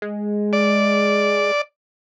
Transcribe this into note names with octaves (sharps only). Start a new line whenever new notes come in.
G#3
D5